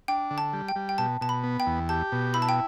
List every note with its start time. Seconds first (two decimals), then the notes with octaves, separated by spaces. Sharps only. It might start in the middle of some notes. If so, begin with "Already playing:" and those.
0.08 D4 G5
0.31 D3
0.38 A5
0.53 G3
0.69 G5
0.76 G3
0.89 G5
0.98 B2 A5
1.21 B2 A5
1.29 B5
1.43 B3
1.60 G5
1.66 E2
1.89 G4 A5
2.12 B2
2.34 E4 B5
2.42 A5
2.49 G5